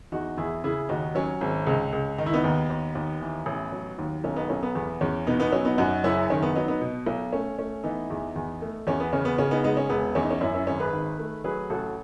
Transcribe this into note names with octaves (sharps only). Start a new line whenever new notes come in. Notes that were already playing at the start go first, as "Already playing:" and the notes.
E2 D#4 F#4
E2 E4 G#4
C#3 E4 G#4
D#2 D#4 F#4
F#3 C#4
G#1
C#2
C#2
D#3 D#4
E4
B3 D#4
D#2
D#2
D#2
E3
A1
F#3
D#2
B1 C#4
B3 D#4
B1 C#4
B3
E2 B3
E2 C#4
B2 B3 D#4
B3 D#4
F#3 C#4
B3 D#4
F#2 D#4 F#4
F#1 C#4 E4
D#3 C#4
B3
F#3 B3 D#4
B3 D#4
B2
B1
A3 C#4
A3 C#4
E3 B3 D#4
E2
E2
A3
E2 C#4
B3
C#3 C#4
B3
C#3 C#4
B3 D#4
G#3 B3 D#4
C#4
E1 B3
E2 C#4
D#4
C#4
F#2 C#4 E4
C#4 E4
G#1 C#4
G#4 B4
D#3
A3
F#3 G#4 B4
A1 F#4 A4